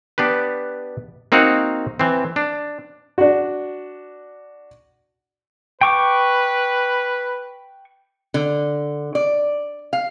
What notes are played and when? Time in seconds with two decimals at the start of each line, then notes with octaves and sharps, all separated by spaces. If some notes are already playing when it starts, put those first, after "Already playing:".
0.18 B3 D4 G4 B4
1.32 A#3 C4 D#4 F#4 F5 F#5
1.99 E3 C4
2.36 D4
3.18 D4 F#4
5.81 B4 G5 C#6 D6
8.34 D3
9.15 D5
9.93 F5